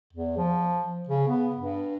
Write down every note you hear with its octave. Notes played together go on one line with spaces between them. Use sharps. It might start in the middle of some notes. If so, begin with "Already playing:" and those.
E2
F3
C#3
B3
G2